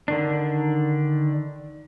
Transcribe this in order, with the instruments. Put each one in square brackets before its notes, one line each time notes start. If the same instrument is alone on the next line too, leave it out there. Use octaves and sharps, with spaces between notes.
[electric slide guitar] D3 D#3 D4